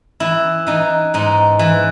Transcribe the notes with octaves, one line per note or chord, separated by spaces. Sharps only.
E3 E4
E3 D#4
G#2 D#4
E3